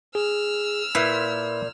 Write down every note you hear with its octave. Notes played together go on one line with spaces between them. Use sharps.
G#4 E6 F6
A#2 E4 B4 G6 G#6